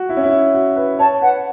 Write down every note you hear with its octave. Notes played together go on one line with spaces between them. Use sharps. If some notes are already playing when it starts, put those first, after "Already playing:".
Already playing: F#4
E4
C#4
E4
F#4
B4
C#5 A5
B4 F#5